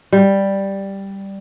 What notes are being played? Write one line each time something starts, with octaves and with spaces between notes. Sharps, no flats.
G3